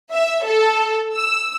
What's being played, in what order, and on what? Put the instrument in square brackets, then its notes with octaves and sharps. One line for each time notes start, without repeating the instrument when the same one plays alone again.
[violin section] E5
A4
E6